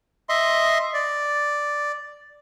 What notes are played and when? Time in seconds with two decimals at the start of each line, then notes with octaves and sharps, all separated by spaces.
0.29 D#5 E5 C6
0.94 D5